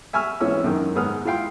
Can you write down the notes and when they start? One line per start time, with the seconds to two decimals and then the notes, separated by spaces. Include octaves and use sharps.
0.13 E5 G#5 C#6 E6 F6
0.40 G#1 E3 C#4 E6
0.64 F#2 D#3
0.96 G#2 B3 D#6 F6
1.25 E4 F4 F5 G5 C6